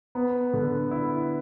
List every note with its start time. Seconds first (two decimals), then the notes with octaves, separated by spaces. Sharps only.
0.15 B3
0.53 D3
0.91 E4